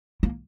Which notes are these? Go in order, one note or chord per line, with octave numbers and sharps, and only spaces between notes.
A#3